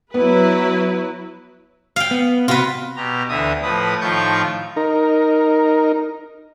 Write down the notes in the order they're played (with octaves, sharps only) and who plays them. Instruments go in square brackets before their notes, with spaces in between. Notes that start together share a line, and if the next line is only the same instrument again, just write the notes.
[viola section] F#3 E4 B4 [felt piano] B3
[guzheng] F5 G5
[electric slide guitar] B3
[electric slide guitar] C3 F#4 [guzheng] F4 B4
[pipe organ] B2 G4 A#5
D2 D3 E3 E5 D#6
A2 F3 B4 D#6
A2 D#3 F3 F4 C#6 G6
[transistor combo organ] D#4 A#4